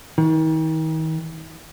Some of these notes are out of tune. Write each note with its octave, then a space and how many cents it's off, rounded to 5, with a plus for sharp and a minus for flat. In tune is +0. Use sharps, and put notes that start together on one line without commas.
D#3 +40